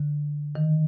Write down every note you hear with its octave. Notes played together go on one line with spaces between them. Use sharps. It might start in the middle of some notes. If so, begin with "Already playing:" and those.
Already playing: D3
D#3